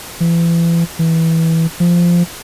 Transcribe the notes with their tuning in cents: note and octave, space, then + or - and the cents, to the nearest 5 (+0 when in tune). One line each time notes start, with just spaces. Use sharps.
E3 +35
E3 -15
F3 -10